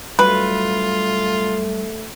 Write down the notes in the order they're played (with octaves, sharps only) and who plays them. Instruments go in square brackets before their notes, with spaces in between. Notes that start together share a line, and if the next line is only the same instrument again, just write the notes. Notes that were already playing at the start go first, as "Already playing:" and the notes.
[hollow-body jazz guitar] G2 F#3 [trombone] A3 [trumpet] F4 [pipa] B4